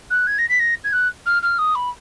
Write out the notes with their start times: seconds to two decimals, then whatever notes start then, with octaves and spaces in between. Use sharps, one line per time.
0.10 F#6
0.27 G#6
0.38 A#6
0.49 B6
0.59 A#6
0.84 G#6
0.93 F#6
1.26 F6
1.42 F6
1.58 D#6
1.75 B5